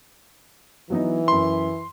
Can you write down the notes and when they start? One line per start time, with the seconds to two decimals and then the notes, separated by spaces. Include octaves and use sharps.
0.90 E3 F#3 B3 D#4
1.28 F#2 B5 C6